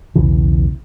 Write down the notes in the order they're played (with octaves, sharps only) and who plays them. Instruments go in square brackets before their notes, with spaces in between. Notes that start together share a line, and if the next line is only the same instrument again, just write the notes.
[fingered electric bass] B1 E2 C#3 E3